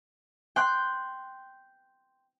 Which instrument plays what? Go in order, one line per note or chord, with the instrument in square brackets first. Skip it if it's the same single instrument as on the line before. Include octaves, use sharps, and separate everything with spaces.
[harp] G5 C6 F#6 G6